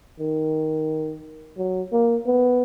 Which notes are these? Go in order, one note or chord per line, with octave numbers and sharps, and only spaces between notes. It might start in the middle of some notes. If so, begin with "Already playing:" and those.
D#3
F#3
A#3
B3